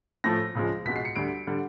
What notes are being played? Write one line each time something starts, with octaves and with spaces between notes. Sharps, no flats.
A2 F3 A3 A#6
C#2 C#3 F3 G#3
C#2 B2 G#3 B6
C7
C#7
D2 D3 G3 D7
D3 G3